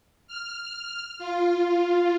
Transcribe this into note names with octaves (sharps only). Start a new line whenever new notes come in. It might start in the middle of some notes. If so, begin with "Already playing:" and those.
F6
F4